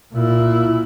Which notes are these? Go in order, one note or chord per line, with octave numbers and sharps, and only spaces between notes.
A#2 E4